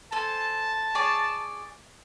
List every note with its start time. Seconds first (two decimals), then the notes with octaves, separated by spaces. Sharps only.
0.12 A4 C5 G#5 A5
0.95 G#4 C#5 D5